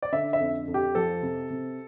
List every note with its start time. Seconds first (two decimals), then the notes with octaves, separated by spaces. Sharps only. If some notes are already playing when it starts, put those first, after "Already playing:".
0.03 D5
0.12 D3 E5
0.33 E5
0.40 F2
0.68 F2
0.74 G4
0.95 F3 A4
1.22 C3
1.50 C3